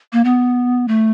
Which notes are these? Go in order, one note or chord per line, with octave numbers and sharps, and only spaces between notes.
A#3
B3
A3